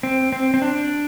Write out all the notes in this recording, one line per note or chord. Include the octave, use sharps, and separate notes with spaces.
C4
C4
C4
D4